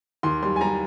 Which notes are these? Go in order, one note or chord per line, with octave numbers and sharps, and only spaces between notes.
D#2 C6
G3 C6
G#5
G3 A#5